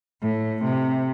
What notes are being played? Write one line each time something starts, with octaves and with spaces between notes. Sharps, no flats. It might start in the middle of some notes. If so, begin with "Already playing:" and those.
A2
C3